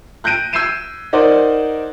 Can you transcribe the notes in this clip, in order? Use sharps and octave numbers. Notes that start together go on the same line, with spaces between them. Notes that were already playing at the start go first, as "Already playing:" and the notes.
F#6 G6 A#6 D7 D#7
E6 G6 G#6 C7 D#7 E7
D#4 A#4 C5 D5 F#5